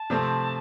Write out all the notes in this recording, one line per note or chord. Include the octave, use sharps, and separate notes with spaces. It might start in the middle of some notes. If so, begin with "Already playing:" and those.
Already playing: A5
C3 F3 A3 C4